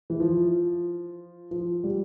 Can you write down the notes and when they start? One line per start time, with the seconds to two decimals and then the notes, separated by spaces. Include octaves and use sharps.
0.10 E3
0.20 F3
1.51 F3
1.84 G3